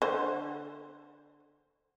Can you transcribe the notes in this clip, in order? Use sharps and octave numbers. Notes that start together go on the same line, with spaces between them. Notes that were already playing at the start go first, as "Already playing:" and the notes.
D3 C5